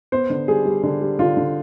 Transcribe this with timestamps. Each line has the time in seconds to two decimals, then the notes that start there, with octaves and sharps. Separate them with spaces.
0.12 B3 C5
0.30 D3
0.48 G3 G#4
0.65 G3
0.83 D3
1.01 G3
1.19 D3 F4
1.37 D3